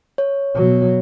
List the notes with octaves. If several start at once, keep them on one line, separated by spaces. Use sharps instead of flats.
C#5
B2 F#3